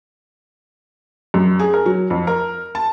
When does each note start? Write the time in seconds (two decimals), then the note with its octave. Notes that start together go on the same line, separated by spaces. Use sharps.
1.34 F#2
1.59 G#4
1.74 A#4
1.86 F#3
2.10 F2
2.27 A#4
2.75 A5